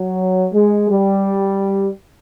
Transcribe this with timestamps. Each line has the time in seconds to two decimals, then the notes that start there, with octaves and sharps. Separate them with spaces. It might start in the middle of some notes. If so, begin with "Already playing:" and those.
Already playing: F#3
0.53 G#3
0.89 G3